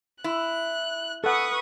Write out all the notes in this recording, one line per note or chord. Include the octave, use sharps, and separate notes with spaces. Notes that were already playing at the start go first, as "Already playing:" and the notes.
E4 F#6
A4 B4 F#5 C#6 D#6